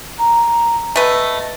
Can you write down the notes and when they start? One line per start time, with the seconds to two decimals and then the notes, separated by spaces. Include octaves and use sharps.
0.18 A#5
0.96 A3 B4 D#5